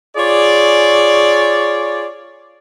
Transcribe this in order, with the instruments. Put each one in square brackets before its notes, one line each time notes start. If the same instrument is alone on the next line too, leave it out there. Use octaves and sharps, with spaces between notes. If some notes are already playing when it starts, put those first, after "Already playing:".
[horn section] F4 G#4 C#5 D5